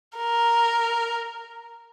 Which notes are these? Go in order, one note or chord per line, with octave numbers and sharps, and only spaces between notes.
A#4